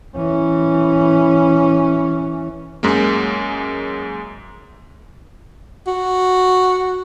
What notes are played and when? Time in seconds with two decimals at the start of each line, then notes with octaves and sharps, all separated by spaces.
0.17 E3 C#4
2.83 F#2 G#3 A#3
5.87 F#4